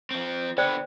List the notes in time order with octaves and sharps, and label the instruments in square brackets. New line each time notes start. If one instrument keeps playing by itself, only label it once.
[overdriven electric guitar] F3 C4
[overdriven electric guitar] D3 B3 [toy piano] C5 D5 G5